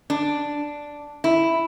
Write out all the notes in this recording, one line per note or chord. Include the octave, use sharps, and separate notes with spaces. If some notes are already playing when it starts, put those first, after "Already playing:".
D4
E4